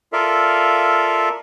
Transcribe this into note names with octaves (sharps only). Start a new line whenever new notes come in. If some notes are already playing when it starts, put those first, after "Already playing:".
F4 A4 A#4 D5 E5 F5